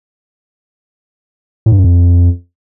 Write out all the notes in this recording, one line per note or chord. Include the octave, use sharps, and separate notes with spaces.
A2
G2
F#2
F2